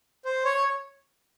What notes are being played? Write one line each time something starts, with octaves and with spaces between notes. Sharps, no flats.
C5
C#5